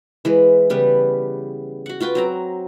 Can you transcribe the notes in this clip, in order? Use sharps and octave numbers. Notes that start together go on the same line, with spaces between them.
E3 G#3 B4
C#3 G3 B3 B4
F#4 F#5
F4 F#4 B4 G5
F#3 C4 A#5